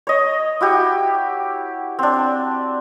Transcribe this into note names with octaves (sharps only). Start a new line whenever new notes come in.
C#5 D#5
E4 F#4 G4
C4 D4